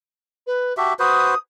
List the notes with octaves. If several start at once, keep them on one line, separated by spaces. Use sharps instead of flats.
B4
F#4 G4 E5 A5
F#4 B4 C5 D#6